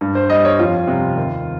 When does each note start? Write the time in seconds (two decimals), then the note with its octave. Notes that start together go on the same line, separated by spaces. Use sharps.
0.01 G2
0.15 C5
0.29 G3 D#5
0.45 C#5
0.59 F2 F4
0.87 C3 G3
1.16 D#2